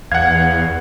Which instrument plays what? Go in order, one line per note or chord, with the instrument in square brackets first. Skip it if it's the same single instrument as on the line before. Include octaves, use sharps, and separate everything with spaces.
[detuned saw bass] E2 [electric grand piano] F5 F#5 [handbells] G#6